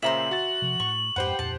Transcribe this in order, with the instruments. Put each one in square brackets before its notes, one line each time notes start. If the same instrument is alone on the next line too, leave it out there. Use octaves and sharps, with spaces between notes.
[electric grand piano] A#2 C#3 C5 [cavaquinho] E5 A#5 C6 [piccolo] F#7
[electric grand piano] F#4 A6
[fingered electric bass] C3 F3
[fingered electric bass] A2 [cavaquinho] C#6
[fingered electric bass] F2 G#2 [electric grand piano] G4 C5 F#5 [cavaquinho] B4 G5
[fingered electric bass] D1 F2 A#2 [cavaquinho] A5